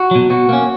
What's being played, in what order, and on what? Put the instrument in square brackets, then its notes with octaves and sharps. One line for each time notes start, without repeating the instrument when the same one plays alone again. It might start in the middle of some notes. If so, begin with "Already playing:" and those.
Already playing: [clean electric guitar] F#4
B2 F#3
B2 F#4
A#3 C#4